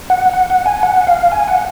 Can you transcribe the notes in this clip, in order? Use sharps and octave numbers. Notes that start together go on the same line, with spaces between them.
F#5
F#5
F#5
G#5
F#5
F5
G#5
F#5